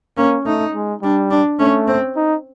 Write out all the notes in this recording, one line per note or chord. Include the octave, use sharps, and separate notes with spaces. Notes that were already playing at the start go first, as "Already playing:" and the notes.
A#3 C#4
A3 D#4
G#3
G3 D4
D4
A3 C#4
C4
D#4